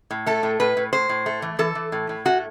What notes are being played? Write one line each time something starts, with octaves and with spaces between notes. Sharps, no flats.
A2
A3 A4
A2
A2 B4
A2
A2 C5
A2
A3
E3
E3 A4
E3
A2
A2
A3 F#4